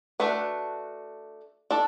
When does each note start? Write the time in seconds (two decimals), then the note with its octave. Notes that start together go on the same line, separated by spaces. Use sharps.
0.20 A3 D4 F#4 B4
1.71 D4 A4